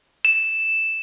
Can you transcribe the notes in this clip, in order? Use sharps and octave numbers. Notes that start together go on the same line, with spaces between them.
E7